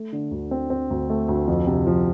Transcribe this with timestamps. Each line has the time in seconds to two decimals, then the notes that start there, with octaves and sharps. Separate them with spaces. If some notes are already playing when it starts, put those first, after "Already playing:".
Already playing: A3
0.12 D3
0.31 D2
0.51 C4
0.70 C4
0.90 D2
1.10 A3
1.29 D2
1.47 F2
1.67 C3
1.87 F3